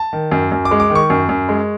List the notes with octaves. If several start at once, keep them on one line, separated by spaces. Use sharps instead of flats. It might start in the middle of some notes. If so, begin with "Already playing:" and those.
Already playing: A5
D#3
F#2
F#2
D6
G#3
D6
D#3
C#6
F#2
F#2
G#3